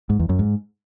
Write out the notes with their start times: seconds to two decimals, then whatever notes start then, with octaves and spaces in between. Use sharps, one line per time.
0.10 G#2
0.19 E2
0.29 F#2
0.39 G#2